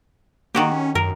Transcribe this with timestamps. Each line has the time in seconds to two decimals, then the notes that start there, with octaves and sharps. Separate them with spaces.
0.55 D#3 A#3 F#4 G4
0.72 C#4
0.95 F#2 A#4